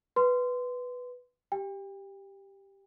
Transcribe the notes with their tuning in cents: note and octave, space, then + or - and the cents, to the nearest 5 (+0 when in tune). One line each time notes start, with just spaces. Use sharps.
B4 +0 C6 -20
G4 +0 G5 +35